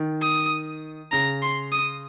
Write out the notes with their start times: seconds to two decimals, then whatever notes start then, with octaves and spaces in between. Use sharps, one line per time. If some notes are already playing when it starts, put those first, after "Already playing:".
Already playing: D#3
0.21 D#6
1.12 C#3 A#5
1.42 C6
1.72 D#6